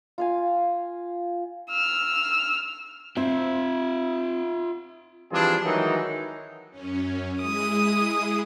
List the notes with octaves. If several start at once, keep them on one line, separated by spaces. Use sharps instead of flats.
F4 F5 G#5
E6 F6
C4 F4 C5 E5
E3 F3 G3 C4 D4 G#4
D#3 E3 F#3 G#3 D#4
F#2 C#4
G#3 E4 G#4 D#6